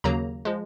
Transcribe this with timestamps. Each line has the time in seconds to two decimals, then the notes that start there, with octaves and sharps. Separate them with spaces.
0.04 D#2 C#3 F#3 A#3 A#5
0.45 F3 G#3